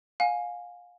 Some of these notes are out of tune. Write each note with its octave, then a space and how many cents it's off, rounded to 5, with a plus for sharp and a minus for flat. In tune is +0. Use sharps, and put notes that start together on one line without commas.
F5 +30 G#5 +0